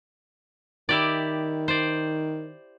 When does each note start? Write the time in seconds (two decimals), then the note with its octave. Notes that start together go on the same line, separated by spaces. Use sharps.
0.89 D#3 E4 G4 D5
1.68 C5 D5